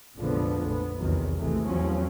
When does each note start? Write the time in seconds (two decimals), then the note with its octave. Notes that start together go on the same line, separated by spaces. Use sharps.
0.16 F1 A#1 D3 F3 G#3 B3
0.64 A#1 B3
0.97 B1 E2 C3 D#3 E3 F#3
1.36 G#1 C3 E3 G#3 A3
1.66 E2 A2 F3 F#3 C4 C#4